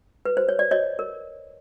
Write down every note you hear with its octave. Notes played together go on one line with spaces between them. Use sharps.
B4
C5
C#5
D5
C#5 D#5
A#4